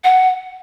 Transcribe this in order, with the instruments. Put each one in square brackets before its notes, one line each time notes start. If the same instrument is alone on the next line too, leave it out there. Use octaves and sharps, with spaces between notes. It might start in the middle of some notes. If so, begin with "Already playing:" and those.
[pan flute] F#5